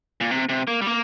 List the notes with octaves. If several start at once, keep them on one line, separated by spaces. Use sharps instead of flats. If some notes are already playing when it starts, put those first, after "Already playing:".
A#2
C3
C3
A#3
G3
A#3